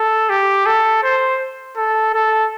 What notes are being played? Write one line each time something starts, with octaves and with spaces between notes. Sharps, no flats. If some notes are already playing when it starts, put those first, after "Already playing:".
Already playing: A4
G4
A4
C5
A4
A4